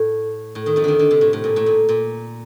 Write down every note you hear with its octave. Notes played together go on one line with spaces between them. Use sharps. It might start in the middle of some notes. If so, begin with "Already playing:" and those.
Already playing: A2
A2
D#3
F2 F3
D3 D#3
D3
C3
A2
A2
A#2
A2
A#2
A#2